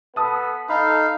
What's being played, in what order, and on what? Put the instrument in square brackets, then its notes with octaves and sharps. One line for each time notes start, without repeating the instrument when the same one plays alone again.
[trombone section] B3 A4 B4 [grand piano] A5 D#6
[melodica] D#4 [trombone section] A4 [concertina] F5 [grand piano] B5